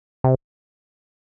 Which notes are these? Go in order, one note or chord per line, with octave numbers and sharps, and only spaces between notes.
C3